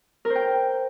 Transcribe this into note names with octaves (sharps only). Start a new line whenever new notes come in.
A#4
C5
G5